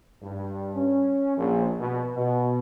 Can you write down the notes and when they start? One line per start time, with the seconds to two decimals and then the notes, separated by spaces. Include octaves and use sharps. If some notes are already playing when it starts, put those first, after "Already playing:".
0.22 G2
0.75 C#4
1.37 A#1
1.79 B2
2.17 B2